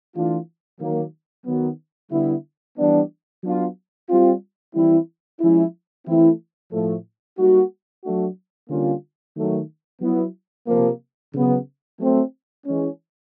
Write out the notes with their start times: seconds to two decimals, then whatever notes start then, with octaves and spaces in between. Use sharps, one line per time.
0.14 E3 A3 D4 F4
0.80 D#3 F#3 A#3
1.46 D#3 F#3 B3
2.11 D3 G3 B3 E4
2.78 E3 G3 B3 D4
3.43 F#3 B3 D4 F4
4.10 G3 C4 F4
4.74 E3 G3 C4 E4
5.40 F3 G#3 C#4 E4
6.06 E3 A3 C4 E4
6.72 A2 F3 A3
7.38 G3 A#3 D#4 F#4
8.04 F#3 A3 D4 F#4
8.69 D3 G3 A#3 C#4 F4
9.36 D#3 F#3 A3
10.01 F#3 B3 E4
10.68 C3 F3 A#3
11.34 C#3 F#3 B3
11.99 F#3 A3 C4
12.66 E3 G#3 C#4